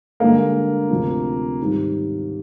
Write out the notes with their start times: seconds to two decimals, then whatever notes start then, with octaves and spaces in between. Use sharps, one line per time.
0.20 G2 D3 G#3 A#3 A#4
0.90 D2 C3 F3
1.60 G#2 D#3 G3